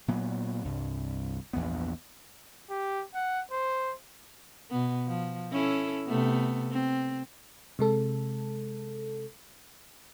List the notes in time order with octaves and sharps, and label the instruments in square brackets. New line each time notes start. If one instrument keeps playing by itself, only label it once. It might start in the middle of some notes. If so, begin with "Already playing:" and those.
[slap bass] A#2 F#3 B3
C2 G2
A#1 E2 G2 B3
[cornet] G4
F#5
C5
[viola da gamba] B2 B3
F3
C#4 E4 A4
C3 A3 B3
C4
[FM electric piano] C3 G#3 A4